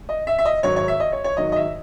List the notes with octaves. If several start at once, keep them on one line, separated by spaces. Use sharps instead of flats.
D#5
E5
E5
D#5
G#2 D#3 F#3 C#5
C#5
E5
D#5
C#5
C#5
G#2 D#3 F#3 D#5
D#5
E5